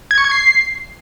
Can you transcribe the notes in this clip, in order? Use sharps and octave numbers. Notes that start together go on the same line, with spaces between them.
G#6
C#6
G#6
C7